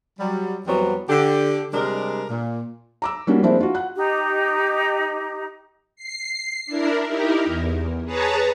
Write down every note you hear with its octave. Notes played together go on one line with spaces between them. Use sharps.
F#3 G3
F2 E3 F#3 G3 B3 C4
D3 G4
C3 G3 G#3 D4 A#4
A#2
A#5 D6 E6
G3 A#3 C#4 F#4
F3 G#3 A#3 C4 D4 E4
F4 F#4
F#5 F#6
D#4 G4
C7
D4 E4 A#4
D#4 E4 G4 A#4
E2
G#4 B4 C#5 A5 A#5